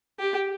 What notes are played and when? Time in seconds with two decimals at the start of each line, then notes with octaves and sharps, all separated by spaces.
0.19 G4